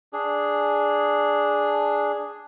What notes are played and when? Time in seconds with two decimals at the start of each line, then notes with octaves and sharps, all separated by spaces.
0.13 D4 G#4